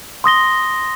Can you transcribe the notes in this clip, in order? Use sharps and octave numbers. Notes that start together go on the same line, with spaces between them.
C6 D#6 A#6 G7